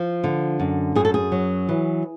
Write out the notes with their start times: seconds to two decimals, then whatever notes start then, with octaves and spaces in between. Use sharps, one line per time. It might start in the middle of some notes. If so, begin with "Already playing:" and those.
Already playing: F3
0.24 D3
0.60 F#2
0.95 F#2 G#4
1.05 A4
1.14 G#4
1.32 F#3
1.69 E3